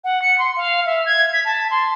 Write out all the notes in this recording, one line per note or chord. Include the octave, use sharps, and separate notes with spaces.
F#5
C#7
C6
F5
E5
G#6
B6
A5
C6